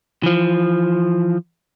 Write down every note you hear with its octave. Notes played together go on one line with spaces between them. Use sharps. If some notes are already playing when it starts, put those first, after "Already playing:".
E3 F3